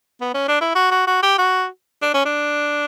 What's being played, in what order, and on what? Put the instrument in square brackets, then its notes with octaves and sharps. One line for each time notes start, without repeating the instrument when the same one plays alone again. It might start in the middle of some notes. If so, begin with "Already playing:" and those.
[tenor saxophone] B3
C#4
D4
E4
F#4
F#4
F#4
G4
F#4
D4
C#4
D4